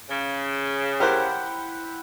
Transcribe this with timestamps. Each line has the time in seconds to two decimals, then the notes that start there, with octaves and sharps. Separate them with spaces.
0.09 C#3
1.00 E4 G4 A#4 C5 F#5 G5